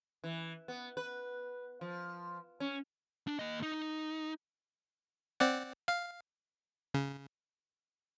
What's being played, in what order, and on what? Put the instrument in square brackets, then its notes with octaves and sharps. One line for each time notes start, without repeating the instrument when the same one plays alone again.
[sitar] E3
B3
B4
F3
C#4
[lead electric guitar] D4
A#3 D#5
D#4
[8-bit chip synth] C4 D5 F#5
F5
C#3